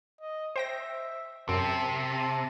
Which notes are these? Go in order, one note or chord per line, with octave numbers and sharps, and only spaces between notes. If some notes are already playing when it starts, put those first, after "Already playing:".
D#5
C5 E5 G5 A#6
F#2 C3 A5
A5